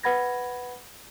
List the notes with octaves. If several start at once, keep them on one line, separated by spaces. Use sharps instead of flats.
B4 F#5 B5 G#6 A#6